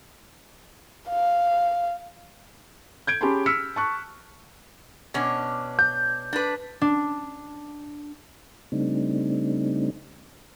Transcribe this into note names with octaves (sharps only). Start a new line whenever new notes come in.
F5
G6 G#6 D7
C#4 G4 G#4 A5 B5 C6
E6 F6 B6 C#7
A5 C#6 F#6
B2 C#4 D4
G6
D4 B4
D4
C#3 G3 A3 C4 D4 D#4